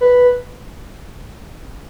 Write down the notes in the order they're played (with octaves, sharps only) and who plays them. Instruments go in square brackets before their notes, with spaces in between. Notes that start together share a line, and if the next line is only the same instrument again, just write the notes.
[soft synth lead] B4